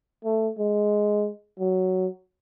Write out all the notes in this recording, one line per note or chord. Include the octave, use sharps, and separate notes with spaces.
A3
G#3
F#3